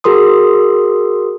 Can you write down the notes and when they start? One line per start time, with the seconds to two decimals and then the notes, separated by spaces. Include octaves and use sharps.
0.04 F#4 G#4 A#4 C6 D#6